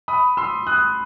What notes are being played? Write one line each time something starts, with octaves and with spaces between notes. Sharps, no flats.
B5 D#6
C6 E6
D#6 F#6